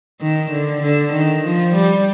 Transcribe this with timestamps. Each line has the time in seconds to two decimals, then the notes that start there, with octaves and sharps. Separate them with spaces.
0.21 D#3
0.51 D3
0.82 D3
1.13 D#3
1.45 F3
1.75 G3